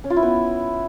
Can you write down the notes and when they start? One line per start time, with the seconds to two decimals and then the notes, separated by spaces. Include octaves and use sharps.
0.04 C#4
0.10 F4
0.16 E4
0.23 B3